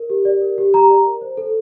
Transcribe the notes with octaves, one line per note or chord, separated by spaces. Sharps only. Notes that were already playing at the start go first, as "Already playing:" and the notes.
Already playing: A#4
G4
D5
A#4
G4
G4 A#5
D5
A#4
C5
A4